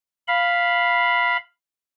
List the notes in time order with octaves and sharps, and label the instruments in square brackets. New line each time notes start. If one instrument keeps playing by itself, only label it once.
[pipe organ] F5 B5